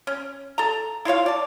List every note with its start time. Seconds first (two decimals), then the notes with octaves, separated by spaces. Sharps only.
0.07 C#4
0.58 A4 A#5
1.05 E4 F4 C#5 F5
1.26 D5 A5